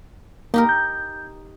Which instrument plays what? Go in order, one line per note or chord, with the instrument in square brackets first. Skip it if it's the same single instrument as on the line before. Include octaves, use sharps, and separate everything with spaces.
[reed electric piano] A#3 [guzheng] D#4 G4 A#4
[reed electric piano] G6